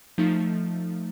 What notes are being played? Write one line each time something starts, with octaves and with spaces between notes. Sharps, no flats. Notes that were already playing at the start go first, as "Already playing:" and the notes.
F3 A3 D#4